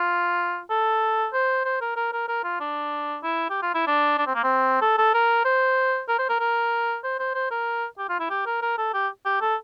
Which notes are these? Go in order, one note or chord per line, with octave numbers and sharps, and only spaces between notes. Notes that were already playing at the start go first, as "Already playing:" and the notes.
Already playing: F4
A4
C5
C5
A#4
A#4
A#4
A#4
F4
D4
E4
G4
F4
E4
D4
D4
C4
A#3
C4
A4
A4
A#4
C5
A#4
C5
A#4
A#4
C5
C5
C5
A#4
G4
F4
E4
G4
A#4
A#4
A4
G4
G4
A4